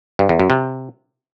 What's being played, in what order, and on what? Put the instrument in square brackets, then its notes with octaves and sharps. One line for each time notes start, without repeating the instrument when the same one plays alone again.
[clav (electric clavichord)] G2
E2
F#2
C3